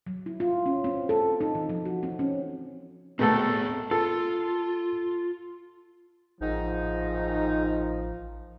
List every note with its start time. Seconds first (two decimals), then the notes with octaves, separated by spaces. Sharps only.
0.07 F#3
0.26 E4
0.40 F4
0.66 C#4
0.84 C4
1.09 A4
1.41 D#4
1.55 E3
1.69 F3
1.85 F#4
2.03 C4
2.19 C#4
3.19 B2 A3 C4 G#4 A4 G5
3.91 F4 A4
6.41 A1 G#2 D#3 F3 D#4